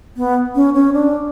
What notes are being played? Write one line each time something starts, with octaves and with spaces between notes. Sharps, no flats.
B3
C#4
C#4
D4